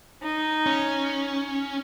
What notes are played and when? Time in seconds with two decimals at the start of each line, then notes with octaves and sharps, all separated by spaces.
0.24 D#4
0.66 C#4